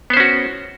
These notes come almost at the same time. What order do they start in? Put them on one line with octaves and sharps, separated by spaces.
B3 C5 C#4 F#4